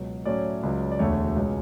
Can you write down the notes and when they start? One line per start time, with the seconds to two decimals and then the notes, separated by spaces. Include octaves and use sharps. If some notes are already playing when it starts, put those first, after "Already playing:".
Already playing: C#2 B2 F#3
0.26 A2 F#3 A3 C#4 E4 D5
0.63 C#2 C#3 F#3
0.91 D5
0.99 E1 D2 D3 A3 C#5
1.36 C#2 B2 G#3 C#4